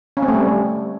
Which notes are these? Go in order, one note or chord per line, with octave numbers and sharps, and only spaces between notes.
C#4
C4
A3
G3